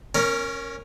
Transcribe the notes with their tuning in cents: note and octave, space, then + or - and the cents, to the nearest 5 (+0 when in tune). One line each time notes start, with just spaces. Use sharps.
C#4 -15 A#4 +0 C#5 +25